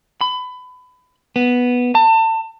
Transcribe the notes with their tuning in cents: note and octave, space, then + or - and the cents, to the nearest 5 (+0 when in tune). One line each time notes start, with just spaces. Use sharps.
B5 +25
B3 -5
A5 +30